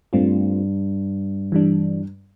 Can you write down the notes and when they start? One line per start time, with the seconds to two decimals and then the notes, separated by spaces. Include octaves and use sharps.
0.13 G2 A3 C4 F4
1.52 E3 G3 D4